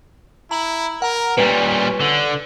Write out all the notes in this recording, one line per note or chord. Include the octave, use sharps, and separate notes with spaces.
E4 A#5 F#7
A#4 F#5 A#5
A#2 G3 C#4 B4
D3